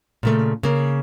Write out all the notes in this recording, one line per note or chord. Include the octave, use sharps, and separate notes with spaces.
A#2 C#3 A3
C#3 A#3